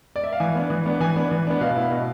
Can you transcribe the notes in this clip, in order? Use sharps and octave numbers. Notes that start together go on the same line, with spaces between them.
D5
E5
F5
E3 G#5
B3 D4
E3
B3 D4
E3 G#5
B3 D4
E3
B3 D4
B2 F5
B3 E4
B2